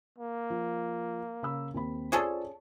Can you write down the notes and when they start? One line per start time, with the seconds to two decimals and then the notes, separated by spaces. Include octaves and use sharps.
0.19 A#3
0.50 F3
1.43 C#3 B5 E6
1.74 D#2 C4 B5
2.12 C#4 F4 G#4 A4 C5 D5